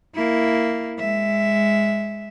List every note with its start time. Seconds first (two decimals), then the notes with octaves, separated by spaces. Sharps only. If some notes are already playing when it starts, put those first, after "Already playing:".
0.15 A#3 E4
0.99 G#3 E5